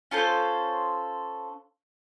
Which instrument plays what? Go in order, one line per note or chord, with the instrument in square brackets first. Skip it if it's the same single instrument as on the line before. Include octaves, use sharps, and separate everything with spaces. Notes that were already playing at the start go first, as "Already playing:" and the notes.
[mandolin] C#4 F4 A4 C5